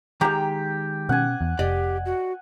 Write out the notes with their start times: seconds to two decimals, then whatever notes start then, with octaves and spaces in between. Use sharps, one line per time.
0.21 D#3 G#3 G4 G5 A#5
1.09 B2 C#4 F#5 G#5
1.41 E2
1.59 F1 G4 D5 D#5
2.06 F#4